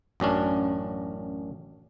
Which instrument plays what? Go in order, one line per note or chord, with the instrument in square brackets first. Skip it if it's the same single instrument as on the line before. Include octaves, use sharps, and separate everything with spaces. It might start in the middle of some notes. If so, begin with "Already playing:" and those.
[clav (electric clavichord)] A1 F#2 C#4 D4